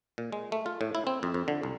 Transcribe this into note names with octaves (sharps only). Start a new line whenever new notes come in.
A#2
G#3
A3
F4
A2
E4
C4
F2
F2
D3
C2